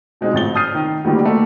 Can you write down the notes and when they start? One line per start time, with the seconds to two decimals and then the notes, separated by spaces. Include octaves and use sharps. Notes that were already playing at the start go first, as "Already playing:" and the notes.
0.21 B2 G#3 C4 D#4
0.33 A1 F3 A6 G7
0.55 D#6 F6 G6 A6 C7 D#7
0.75 D#3
1.04 D2 D#3 G3 A#3
1.25 D3 A3 A#3 A4